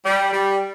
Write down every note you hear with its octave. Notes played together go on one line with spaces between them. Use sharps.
G3
G3